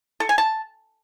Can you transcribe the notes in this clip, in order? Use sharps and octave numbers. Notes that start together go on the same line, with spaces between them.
A4
G#5
A5